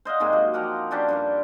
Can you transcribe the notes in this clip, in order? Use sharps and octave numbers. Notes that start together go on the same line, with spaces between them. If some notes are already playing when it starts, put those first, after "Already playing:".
C5 D#5 F5 F#5
G#2 C3 G#3 A#3
F#3
F3 G4 A#4 F#5
C#4 D4 G4 C5
G2 D4 A#4